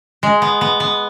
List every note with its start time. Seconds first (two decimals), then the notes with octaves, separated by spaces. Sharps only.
0.23 G#3
0.42 B3
0.61 B3
0.80 B3